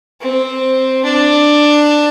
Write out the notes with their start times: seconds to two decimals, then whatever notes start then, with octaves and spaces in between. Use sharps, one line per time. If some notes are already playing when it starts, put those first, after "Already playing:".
0.21 C4
1.04 D4